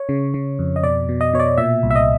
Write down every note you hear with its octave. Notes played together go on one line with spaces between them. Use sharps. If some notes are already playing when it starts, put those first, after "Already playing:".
Already playing: C#5
C#3
C#3
F2
D#5
B2 D5
B2
D#5
B2 C#5
D5
A#2 E5
C2
E5
D#5